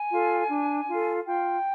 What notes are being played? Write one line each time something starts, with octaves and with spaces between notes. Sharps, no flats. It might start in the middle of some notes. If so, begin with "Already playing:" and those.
Already playing: G#5
F4 A4
D4
F4 A4
F4 G5